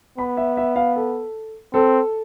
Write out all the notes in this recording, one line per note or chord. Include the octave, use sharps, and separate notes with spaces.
B3 B5
E5
E5
F5
A4
C4 A4